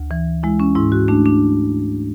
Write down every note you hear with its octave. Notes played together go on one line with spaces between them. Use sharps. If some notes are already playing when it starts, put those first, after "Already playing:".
Already playing: D2
E3
G#3 E4
C#4
G#2 E4
F#4
A3 D4
D4